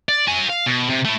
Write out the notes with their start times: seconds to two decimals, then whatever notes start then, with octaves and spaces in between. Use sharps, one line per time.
0.09 D5
0.27 F#4 G#5
0.49 F5
0.66 B2
0.90 C3
1.05 A3 E4